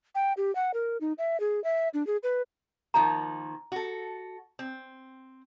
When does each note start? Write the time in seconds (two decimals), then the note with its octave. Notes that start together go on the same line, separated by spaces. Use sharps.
0.15 G5
0.37 G4
0.55 F#5
0.74 A#4
1.01 D#4
1.18 E5
1.40 G#4
1.64 E5
1.94 D4
2.07 G#4
2.23 B4
2.94 D#3 F3 A#3 A#5
3.72 F#4 A4
4.59 C4